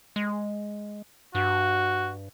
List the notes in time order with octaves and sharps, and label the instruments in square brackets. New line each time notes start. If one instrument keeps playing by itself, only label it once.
[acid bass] G#3
[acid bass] G2 [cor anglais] F#4